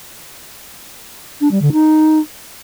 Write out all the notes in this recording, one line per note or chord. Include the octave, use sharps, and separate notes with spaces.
D4
G3
D3
D#4